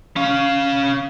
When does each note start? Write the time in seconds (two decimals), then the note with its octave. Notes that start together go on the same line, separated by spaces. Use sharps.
0.16 C#4 F5